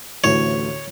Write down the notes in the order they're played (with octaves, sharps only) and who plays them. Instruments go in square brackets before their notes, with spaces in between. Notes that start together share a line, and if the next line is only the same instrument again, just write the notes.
[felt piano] A1 D2 A2 [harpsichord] C#5